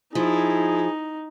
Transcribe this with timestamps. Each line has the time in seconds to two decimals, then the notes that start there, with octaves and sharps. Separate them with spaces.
0.15 F3 D#4 E4 G#4